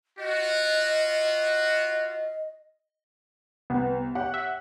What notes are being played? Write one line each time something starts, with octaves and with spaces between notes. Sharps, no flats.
F4 F#4 D#5
C2 B3
G4 C#5 F#5
E5